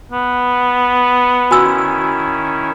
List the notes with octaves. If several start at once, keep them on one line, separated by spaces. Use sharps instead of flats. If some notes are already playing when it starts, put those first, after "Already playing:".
B3
D#3 C#4 E4 F#4 G#5 E6